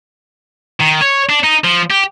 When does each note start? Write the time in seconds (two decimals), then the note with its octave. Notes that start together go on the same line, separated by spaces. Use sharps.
0.80 D#3
1.02 C#5
1.30 D4
1.44 D#4
1.64 F3
1.91 G4